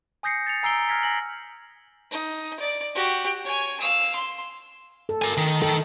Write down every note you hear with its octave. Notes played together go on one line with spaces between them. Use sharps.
G#5 D#6 G6 A#6 C7 C#7
A6 C#7 F7
G#5 A#5 E6 C7 D7 G7
F6 G#6 A#6 B6
G#5 A#6 F#7
D#4
D5
F#4 G4
C#5 G#5
F5 E6
C6
A4
A#4 G#5
D#3
D#3 A4